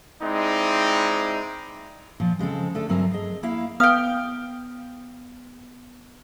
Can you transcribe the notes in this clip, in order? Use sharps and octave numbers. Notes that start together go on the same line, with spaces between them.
G#3 C4 D#4 E4 D5
A#2 F3
C#3 G#3 C4 A4
D3 A3 D4 A4
G2 F#3 C4 A#4 E5 G#5
G#4 D#5
A#3 E4 E5 F5
B3 F5 G5 D#6 F6